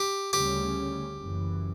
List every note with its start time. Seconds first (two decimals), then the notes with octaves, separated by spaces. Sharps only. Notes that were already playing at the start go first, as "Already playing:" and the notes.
Already playing: G4
0.33 D2 C#3 G3 C#4 G4
1.17 F#1 F#2 E3